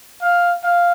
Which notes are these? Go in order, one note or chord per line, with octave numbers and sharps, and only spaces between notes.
F5
F5